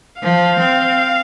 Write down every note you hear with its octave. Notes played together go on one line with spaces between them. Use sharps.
F3 F5
C4